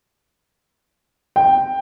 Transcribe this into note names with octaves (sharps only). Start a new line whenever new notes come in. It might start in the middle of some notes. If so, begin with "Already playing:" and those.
G5